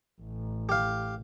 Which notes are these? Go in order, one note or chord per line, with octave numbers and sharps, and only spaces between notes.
A1
G4 F5